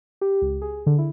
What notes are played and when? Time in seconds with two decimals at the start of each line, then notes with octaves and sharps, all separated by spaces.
0.21 G4
0.42 C#2
0.62 G#4
0.86 D3
0.98 E4